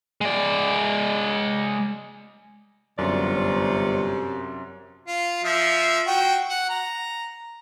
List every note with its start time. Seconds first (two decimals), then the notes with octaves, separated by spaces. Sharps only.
0.21 G#3 D5
2.98 G1 F#2 C3 F4 C#5 D5
5.07 F4
5.44 F3 E5
6.07 F#4 G5
6.49 F#5
6.69 A#5